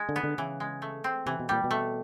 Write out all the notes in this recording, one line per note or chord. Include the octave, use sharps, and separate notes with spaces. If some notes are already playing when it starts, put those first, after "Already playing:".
Already playing: G#3
D3
B3
D3
C#3 E3
G#3
A3
C4
C3 E3
B2
A#2 G3
B2
A3